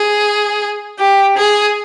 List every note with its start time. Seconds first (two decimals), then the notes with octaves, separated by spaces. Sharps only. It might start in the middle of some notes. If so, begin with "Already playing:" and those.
Already playing: G#4
0.99 G4
1.38 G#4